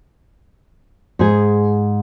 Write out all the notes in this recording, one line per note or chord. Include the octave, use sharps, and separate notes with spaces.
G#2 G#4